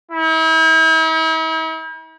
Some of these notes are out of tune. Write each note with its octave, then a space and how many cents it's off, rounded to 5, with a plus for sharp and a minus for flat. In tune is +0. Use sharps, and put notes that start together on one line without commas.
E4 -45